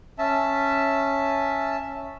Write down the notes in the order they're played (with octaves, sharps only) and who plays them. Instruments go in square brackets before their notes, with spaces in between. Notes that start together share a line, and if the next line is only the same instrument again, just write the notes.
[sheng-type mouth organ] C#4 E5 A5